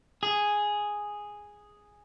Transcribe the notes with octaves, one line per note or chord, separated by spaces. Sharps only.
G#4